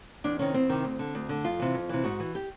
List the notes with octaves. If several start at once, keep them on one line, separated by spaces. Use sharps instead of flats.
E2 D4
C3 D#3 C#4
E2 C4
C3 D#3
D2
D3
D2
D3
F2 F4
C3 E3
F2
C3 E3
G#2 F#4
E3
G4